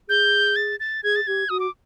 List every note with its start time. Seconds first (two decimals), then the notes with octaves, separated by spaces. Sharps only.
0.08 G#4 G6
0.56 A6
0.80 A6
1.03 G#4 G#6
1.16 A6
1.27 G4 G#6
1.49 F#4 D#6
1.60 D6